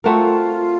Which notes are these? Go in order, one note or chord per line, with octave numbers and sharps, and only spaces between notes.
A3 C4 F4 F#4 A#4